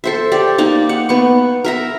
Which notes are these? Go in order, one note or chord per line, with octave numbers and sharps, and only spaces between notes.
A4 C5 E5
G4 D5
A#3 D#4 D5
F#5
B3 C#6
A#4 E5 A#5